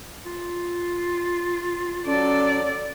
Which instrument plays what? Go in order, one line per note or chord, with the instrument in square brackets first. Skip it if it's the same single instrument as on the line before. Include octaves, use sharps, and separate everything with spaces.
[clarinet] F4
[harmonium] F#3 A4 [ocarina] C#4 [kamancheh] D5